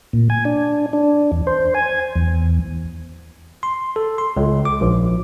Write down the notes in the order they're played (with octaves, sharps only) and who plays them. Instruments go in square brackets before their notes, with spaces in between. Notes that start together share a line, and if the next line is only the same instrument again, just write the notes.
[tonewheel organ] A#2
G#5
D4
D4
E2
C5
G#5
E2
[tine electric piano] C6
A4
C6
C#2
D6
A#1